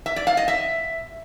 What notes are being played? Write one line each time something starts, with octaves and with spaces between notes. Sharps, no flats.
E5
D5
F5
D#5
E5